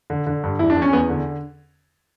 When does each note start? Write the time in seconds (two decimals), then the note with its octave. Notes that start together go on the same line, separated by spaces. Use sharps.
0.10 D3
0.27 D3
0.43 G2
0.59 E2 E4
0.70 D4
0.76 E2
0.82 C#4
0.93 E2 B3
1.09 D3